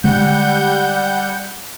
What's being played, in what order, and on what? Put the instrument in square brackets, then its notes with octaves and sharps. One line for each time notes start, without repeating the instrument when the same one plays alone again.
[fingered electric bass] D3 G#3 [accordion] G3 F#5 G6